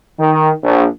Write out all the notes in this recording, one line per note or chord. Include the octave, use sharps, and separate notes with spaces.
D#3
A#1